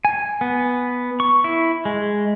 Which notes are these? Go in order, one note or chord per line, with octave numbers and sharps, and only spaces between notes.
G#5
B3
C#6
E4
G#3